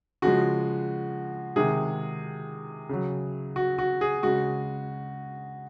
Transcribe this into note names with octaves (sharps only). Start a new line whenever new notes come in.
C#3 F3 G#3 F#4
C3 D#3 G#3 G#4
C#3 F#3
F#4
F#4
G#4
C#3 G#3 F#4